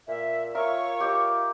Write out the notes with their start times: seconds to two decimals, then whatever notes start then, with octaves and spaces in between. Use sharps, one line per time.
0.08 A#2 E5
0.55 F4 A#4 C#5 E5 C#6
1.00 G4 D#5 D6